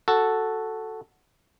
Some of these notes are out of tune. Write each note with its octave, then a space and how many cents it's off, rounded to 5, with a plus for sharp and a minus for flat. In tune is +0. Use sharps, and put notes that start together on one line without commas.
F#4 +0 A4 +0